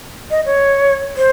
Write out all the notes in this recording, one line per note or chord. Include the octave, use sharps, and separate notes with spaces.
D#5
C#5
C5